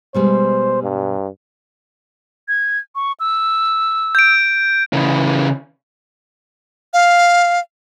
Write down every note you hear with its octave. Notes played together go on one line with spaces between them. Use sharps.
B2 G3 G#3 C5
G2
G#6
C#6
E6
G6 D7
C#3 E3
F5